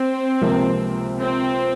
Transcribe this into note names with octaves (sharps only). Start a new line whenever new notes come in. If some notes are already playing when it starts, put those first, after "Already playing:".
Already playing: C4
C#2 C3 F3 A#3
C4